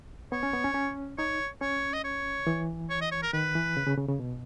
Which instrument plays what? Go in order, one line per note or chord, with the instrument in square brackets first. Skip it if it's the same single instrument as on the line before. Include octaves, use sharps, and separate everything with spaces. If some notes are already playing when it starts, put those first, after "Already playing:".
[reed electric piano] B3 [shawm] C#5
[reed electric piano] C#4
B3
C#4
C#4
[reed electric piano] D#4 [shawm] C#5
[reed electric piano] C#4 [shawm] C#5
[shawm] D#5
C#5
[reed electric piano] E3
[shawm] C#5
D#5
C#5
A#4
[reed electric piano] D#3 [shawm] B4
[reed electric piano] E3
C#3
C#3
C#3
C#3
B2